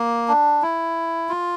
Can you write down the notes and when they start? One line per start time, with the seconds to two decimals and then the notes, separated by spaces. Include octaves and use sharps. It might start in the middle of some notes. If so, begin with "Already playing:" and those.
Already playing: A#3
0.28 D4
0.62 E4
1.29 F4